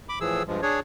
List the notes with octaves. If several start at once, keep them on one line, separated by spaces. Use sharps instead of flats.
B5 D6
A2 E3 F3 G#4 E6
G2 F3 G#3
D4 G#4 C#5